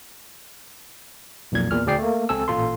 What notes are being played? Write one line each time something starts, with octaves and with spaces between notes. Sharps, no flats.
B1 F2 A#2 G#6
E2 A#2 F6
D2 G#4 D5 G5 C7
A3 A#3
C#2 C4 A4 G#5 E6
A1 A#2 F4 A4 C6